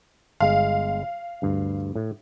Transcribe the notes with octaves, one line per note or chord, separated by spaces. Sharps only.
G1 G#3 F5
D2 G2
A2